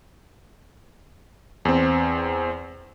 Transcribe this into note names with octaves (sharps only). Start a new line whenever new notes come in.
E2 C4